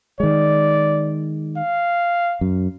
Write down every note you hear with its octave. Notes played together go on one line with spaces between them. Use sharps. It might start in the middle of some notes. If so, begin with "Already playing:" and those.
D#3 G#3 D5
F5
F#2